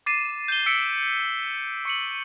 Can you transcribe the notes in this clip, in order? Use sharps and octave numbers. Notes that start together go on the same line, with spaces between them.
D6 A6 C7 D#7 E7
G6 D#7 G7
E6 B6 C#7 D7
C#6 C#7 F#7